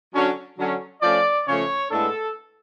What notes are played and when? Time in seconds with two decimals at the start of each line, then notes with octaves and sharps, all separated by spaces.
0.14 D3 F#3 C#4
0.58 D3 F#3 C#4
1.02 F3 A3 C#4 D5
1.46 C#3 F3 A3 C#4 C#5
1.91 A2 G#3 B3 D4 A4